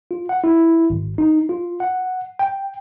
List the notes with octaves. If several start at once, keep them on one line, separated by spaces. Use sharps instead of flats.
F4
F#5
E4
G#1
D#4
F4
F#5
G5